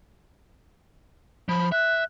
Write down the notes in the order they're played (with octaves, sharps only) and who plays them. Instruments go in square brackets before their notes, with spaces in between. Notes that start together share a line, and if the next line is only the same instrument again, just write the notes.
[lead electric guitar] F3 [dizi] B5
[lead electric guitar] E5 [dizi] F#6